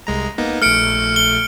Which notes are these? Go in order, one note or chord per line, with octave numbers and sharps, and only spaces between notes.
C2 G#3 A#5
A#3 B3 D#4
A#1 A3 F6 C#7 D7
G7